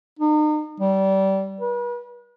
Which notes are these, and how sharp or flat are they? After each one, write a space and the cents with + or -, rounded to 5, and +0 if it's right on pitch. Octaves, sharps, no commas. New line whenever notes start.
D#4 -40
G3 -25
B4 -40